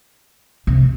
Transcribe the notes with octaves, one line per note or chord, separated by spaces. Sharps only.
C3